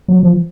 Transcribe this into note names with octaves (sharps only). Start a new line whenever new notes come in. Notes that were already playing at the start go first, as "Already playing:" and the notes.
F#3
F3